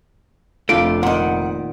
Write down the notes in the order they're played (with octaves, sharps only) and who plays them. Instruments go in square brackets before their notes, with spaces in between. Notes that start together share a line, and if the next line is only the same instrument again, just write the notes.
[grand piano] F1 D7 [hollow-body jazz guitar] A3 [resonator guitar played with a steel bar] D4 F4
[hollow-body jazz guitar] A#2 D#3 [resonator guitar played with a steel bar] F#5